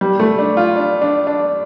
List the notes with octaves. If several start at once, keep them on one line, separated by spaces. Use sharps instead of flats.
G3
A3
D4
F4
D4
D4
D4